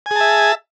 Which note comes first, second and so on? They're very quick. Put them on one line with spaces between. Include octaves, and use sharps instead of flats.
G#5 G#4 A5 E5